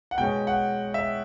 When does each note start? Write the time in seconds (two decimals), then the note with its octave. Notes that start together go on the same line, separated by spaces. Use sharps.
0.11 F#5
0.18 B2 G#3 C#4 G5
0.47 F#5
0.94 E5